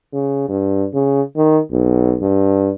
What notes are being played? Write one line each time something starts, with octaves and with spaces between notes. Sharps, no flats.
C#3
G2
C#3
D#3
B1
G2